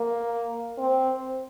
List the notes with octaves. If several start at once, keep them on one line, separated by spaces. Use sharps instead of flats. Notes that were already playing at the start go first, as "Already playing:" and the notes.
Already playing: A#3
C4